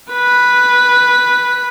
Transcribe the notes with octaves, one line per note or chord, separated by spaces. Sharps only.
B4 B6